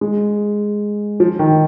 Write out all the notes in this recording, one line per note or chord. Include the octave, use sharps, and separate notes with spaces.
G#3
F3
D#3